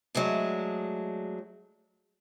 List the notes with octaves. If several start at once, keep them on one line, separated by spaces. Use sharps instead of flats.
F#3 G#3 A3 D4